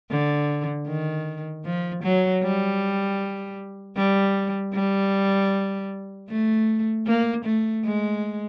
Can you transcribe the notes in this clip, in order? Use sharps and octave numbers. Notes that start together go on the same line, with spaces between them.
D3
D#3
F3
F#3
G3
G3
G3
A3
A#3
A3
G#3